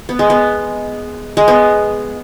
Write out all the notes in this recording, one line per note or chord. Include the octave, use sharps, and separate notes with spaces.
B3
G#3
B3
G#3
B3